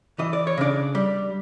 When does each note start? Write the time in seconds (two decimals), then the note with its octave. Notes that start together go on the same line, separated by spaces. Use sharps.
0.19 E3 D#5
0.33 D5
0.47 C#5
0.57 C#3 D4 D5
0.95 G3